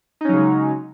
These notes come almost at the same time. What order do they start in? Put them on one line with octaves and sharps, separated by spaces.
D#4 C#4 F#3 C#3 G#3